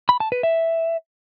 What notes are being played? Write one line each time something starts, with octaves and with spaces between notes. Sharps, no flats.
B5
A5
B4
E5